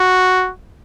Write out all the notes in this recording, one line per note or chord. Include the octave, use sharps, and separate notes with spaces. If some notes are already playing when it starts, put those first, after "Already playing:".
Already playing: F#4